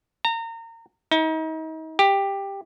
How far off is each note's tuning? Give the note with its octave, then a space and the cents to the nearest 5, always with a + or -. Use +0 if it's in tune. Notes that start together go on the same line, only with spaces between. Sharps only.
A#5 -30
D#4 +35
G4 +10